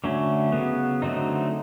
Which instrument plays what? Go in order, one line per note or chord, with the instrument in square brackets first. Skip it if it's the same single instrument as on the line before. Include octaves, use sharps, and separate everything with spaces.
[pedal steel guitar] D3 F#3 A3 C#4
C#3 F#3 B3
D3 F#3 A3 C4 D#4